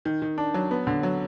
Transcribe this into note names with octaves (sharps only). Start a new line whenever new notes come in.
D#3
D#3
D4
F#3
B3
D3
F#3